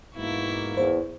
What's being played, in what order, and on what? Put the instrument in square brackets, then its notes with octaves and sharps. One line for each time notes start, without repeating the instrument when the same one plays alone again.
[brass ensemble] G#2 B2 A#3 [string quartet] E3 E4 C#6
[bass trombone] E2 [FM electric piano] C5